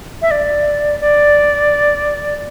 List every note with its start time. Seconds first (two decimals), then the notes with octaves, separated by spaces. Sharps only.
0.22 E5
0.31 D5
1.00 D5